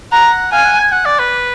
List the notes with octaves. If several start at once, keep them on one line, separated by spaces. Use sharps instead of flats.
F#5 A#5
F5 G#5
F#5
G#5
F#5
D5
B4